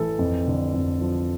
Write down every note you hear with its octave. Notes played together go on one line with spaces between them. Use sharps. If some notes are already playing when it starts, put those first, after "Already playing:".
Already playing: A1 E3 A4
F2
D3
F2
F3